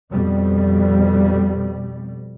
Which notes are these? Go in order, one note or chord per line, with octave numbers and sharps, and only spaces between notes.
F2 B2 G3